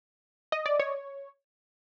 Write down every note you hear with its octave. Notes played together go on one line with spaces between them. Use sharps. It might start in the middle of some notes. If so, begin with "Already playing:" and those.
D#5
D5
C#5